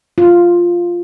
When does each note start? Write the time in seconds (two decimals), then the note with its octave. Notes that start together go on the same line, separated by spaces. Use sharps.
0.18 F4